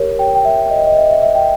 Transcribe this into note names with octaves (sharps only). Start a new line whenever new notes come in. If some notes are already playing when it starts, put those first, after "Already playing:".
Already playing: G4 A#4 C#5
G5
G5
E5
D#5
D#5
E5
E5
E5
G5